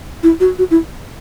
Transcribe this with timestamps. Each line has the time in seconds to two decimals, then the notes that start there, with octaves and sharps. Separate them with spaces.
0.23 E4
0.40 F#4
0.59 F#4
0.71 E4